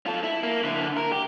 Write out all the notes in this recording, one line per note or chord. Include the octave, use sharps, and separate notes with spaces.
F4 A4
E4
A#3
D3 E4
A#4
G4